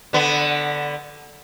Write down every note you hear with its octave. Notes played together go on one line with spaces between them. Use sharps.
D3 B3